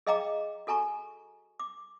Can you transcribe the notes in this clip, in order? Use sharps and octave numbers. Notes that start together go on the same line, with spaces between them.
G#4 D#5 F5 G5 A#5 D6
F#4 A4 G#5 A#5 C#6
D6